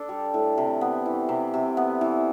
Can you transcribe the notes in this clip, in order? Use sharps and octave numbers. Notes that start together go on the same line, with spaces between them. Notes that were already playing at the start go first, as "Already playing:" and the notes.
Already playing: D4 A4
G3
A2
C3
B3
E3
C3
C3
B3
E3